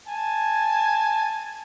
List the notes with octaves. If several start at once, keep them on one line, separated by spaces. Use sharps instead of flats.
G#5 A5